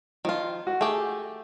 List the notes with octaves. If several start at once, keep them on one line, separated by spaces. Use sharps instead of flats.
D#3 F3 F4
F#4
A3 G4 G#4